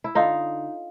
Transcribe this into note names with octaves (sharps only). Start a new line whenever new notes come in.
E4
D3 D#4 F4